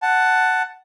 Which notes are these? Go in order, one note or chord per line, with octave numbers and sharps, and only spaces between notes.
F#5 A5